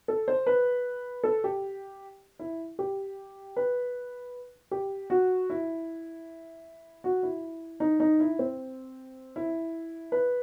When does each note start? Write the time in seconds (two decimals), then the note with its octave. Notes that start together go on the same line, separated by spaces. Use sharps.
0.08 A4
0.28 C5
0.47 B4
1.24 A4
1.44 G4
2.39 E4
2.79 G4
3.56 B4
4.71 G4
5.10 F#4
5.50 E4
7.04 F#4
7.23 E4
7.80 D#4
8.00 D#4
8.20 E4
8.39 C4
9.36 E4
10.12 B4